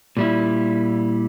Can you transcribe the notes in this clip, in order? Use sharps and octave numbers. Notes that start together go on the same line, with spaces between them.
A#2 G3 E4